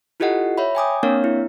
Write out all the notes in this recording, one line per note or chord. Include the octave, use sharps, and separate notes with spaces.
E4 F4 G4 A4 D#5 F#5
C#5 E5 B5
G5 G#5 D6 D#6
A#3 C4 D4 A#4 C#5 F5
E4